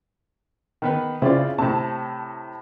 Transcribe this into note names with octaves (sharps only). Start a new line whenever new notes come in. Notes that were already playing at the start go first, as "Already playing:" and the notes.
D#3 B3 B4
C#3 C4 E4 F4 D5
A2 C3 A5